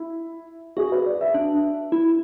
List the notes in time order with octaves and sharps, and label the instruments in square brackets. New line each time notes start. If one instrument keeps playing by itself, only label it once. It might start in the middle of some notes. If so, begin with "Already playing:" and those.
Already playing: [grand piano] E4
[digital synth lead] F#4 [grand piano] G#4
[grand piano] B4
D5
E5
[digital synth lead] D4
E4